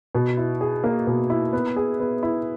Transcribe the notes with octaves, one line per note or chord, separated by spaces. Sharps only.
B2
E4
G#4
A#3
B2
E4
B3
G#4
B3
E4